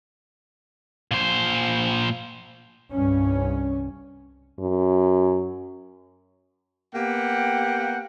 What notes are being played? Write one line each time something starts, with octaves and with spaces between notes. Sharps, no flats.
A#2 C5
C2 G2 C#4
F#2
A#3 B3 G4 F#5 G5